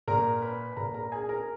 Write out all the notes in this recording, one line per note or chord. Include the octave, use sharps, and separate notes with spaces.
A#2 A#4 A#5
B4 B5
B5
A#2 A#4 A#5
A#4 A#5
G#4 G#5
A#4 A#5